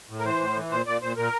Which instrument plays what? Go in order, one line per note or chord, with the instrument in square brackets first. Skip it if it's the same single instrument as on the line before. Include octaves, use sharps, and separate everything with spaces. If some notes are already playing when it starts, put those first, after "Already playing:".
[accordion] A2
A#4
E3 C5
A2
E3
A#2 C5
A#2 D5
A#2 C5
A#2 A#4